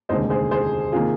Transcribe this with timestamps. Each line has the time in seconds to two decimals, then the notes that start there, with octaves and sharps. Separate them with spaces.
0.09 F1 D#2 D3 G#3 C5 D#5
0.30 G#4 C5
0.51 G#4 C5
0.92 C3 D#3 A#3 F4 G#4